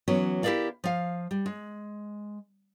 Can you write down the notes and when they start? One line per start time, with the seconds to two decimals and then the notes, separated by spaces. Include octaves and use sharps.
0.08 E3 F#3 B3 C#4
0.43 E4 G4 G#4 A#4 D5 F5
0.84 F3 F5
1.31 G3
1.46 G#3